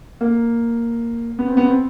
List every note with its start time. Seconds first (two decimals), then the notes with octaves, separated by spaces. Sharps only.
0.21 A#3
1.39 B3
1.48 C4
1.57 B3
1.66 C4